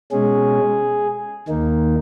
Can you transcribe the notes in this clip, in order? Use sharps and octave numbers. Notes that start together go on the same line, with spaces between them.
B2 G#3 C#4 G#4
D#2 D#3 A#3 D#4